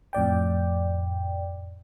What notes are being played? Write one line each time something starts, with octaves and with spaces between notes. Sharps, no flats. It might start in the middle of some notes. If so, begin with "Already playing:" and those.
F2 A2 D5 G5